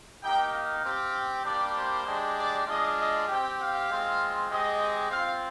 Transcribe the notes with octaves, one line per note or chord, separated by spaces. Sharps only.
A#3 D#4 G4 G5
F5
C4 G4
G3 A#3 D4 G4 D5
C5
G#3 D4 G4
D5
G#3 D4 F4 D#5
D#5
C4 G4 G5
F5
G#3 C4 F4
G#3 C4 G4 D#5
C4 F4 F5